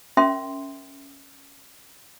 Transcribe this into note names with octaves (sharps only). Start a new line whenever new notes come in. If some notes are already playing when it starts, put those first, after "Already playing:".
C#4 A#4 E5 G5 C6